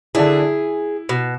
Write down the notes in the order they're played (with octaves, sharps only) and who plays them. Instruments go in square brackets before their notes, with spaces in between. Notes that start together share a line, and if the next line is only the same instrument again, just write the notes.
[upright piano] D3 D4 E4 [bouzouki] G#4
[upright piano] E4
[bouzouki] B2